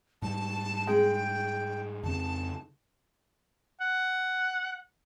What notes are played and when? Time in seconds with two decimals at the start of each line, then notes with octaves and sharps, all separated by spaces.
0.22 G#2 G3 A5
0.87 G#3 G5
2.04 F2 C#3 C4 A5
3.81 F#5